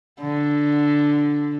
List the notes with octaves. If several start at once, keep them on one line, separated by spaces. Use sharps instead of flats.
D3